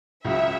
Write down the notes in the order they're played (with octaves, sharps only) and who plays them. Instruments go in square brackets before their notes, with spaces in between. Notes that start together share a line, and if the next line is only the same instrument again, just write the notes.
[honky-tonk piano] C#2 C#3 F#3 [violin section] E5